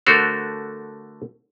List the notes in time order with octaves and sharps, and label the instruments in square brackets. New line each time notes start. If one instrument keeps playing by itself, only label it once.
[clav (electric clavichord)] D3 A3 F#4 A4 A#4 C5